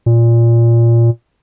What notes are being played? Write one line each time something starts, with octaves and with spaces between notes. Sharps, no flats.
A#2